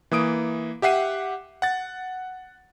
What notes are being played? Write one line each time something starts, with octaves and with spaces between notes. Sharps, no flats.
E3 A#3 D#6 D7
G4 E5 F#5 C7 D#7
F#5 A6